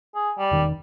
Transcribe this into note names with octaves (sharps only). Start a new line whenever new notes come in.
G#4
G3
E1 D#3